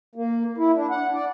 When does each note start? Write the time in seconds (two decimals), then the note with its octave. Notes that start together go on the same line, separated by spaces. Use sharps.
0.15 A#3
0.58 E4
0.75 D4
0.90 F#5
1.14 D5